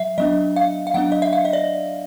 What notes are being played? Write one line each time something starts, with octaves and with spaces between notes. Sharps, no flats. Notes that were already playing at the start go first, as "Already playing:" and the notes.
Already playing: F#3 E5
F#3 B3 D4 D#5
F5
F5
F#3 B3 D4 F#5
D#5
E5
F5
D#5
D5